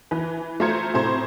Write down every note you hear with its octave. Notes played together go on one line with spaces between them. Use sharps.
E3 B4
A3 F4 C5 A#5 G#6 C#7
A2 C3 C5 A#5 G#6